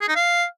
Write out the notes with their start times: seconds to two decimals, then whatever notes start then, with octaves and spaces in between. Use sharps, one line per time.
0.01 G#4
0.08 D#4
0.15 F5